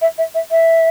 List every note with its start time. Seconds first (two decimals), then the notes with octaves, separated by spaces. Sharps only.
0.02 E5
0.18 E5
0.35 E5
0.51 E5